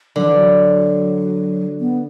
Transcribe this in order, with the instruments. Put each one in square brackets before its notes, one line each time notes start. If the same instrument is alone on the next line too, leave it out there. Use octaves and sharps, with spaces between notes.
[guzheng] D3 [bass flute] F#3
[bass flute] E3
F#3
B3